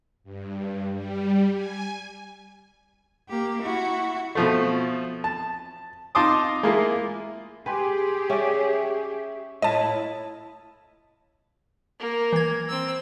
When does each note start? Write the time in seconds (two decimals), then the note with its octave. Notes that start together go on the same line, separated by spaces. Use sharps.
0.24 G2
0.92 G3
1.53 G#5
3.29 A#3 G4
3.62 E4 F#4
4.35 B2 F3 A3
5.24 A5
6.15 D#4 F4 A5 C6 D6 D#6
6.63 G#3 A#3 E4 F4
7.66 G4 G#4 B4 G5 G#5 C6
8.30 C#4 C#5 D5 E5 C#6
9.62 A2 E4 F4 D#5 A5
11.99 A#3 A#4
12.33 E3 G#6
12.69 C4 E6